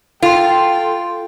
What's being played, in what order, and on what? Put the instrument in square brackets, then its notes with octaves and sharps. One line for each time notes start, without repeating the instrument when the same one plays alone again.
[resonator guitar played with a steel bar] F4 [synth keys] A4 C6 [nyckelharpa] G5